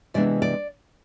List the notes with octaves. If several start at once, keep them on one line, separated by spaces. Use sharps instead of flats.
C3 E3 G#3 B3 D4 D5
D5